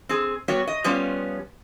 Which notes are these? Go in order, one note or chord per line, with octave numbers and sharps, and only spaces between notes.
C4 G#4
G3 B3 F#4 C#5
D#5
F3 G3 B3 C#4 F4